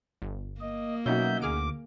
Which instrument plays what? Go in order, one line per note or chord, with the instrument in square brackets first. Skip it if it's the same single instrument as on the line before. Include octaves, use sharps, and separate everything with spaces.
[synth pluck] G1
[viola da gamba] A#3 [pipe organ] D#5
[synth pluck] B2 [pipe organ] F#3 E5 G6 [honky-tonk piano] C#4 D#4 F#4
[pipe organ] D2 D6 [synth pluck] G#4 F6 D7